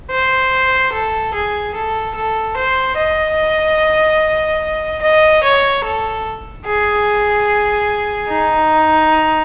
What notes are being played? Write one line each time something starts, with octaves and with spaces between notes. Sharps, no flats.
C5
A4
G#4
A4
A4
C5
D#5
D#5
C#5
A4
G#4
D#4